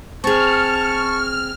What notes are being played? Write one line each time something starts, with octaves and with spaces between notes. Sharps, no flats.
C4 G#4 A5 C#6 F6